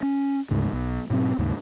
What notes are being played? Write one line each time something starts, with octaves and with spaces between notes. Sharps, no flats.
C#4
D2 G#2 C#3
B1
G#2 B2 F#3 C4
D#2 G#2 C#3